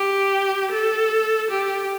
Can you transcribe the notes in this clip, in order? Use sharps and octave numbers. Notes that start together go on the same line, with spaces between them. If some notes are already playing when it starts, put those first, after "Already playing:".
Already playing: G4
A4
G4